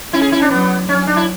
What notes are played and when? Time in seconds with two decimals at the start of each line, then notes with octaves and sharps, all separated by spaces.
0.12 C#4 E4
0.22 G#4
0.32 E4
0.42 D4
0.51 F#3 B3
0.88 F#3 C#4
1.07 D4
1.17 E4